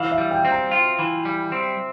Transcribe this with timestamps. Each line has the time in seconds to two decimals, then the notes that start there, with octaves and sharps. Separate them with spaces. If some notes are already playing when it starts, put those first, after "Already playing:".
Already playing: E3 F5
0.12 E5
0.18 G3
0.31 G5
0.45 C4
0.51 A#5
0.72 F4
0.99 E3
1.25 G3
1.52 C4